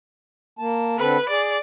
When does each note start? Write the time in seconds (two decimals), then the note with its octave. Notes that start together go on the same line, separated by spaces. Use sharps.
0.59 A#3 A5
0.98 D3 C4 A4 B4
1.30 G#4 D5